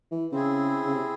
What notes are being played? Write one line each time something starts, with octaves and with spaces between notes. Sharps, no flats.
E3
C#3 C4 E4 G#4
C#3
C3